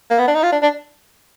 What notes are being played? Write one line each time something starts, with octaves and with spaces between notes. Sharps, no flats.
A#3
B3
D4
D#4
F4
D4
D4